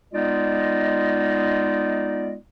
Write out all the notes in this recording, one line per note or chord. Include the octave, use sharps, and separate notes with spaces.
G#3 B3 D#4 F4 D5 D#5